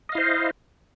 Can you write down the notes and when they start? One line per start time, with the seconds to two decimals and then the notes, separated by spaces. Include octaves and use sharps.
0.09 D#5
0.12 F5
0.15 E4
0.18 C5